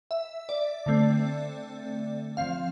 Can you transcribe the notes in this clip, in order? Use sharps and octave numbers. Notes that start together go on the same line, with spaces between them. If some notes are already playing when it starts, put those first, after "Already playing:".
E5
D5
D3 A3 C4
F3 C4 F5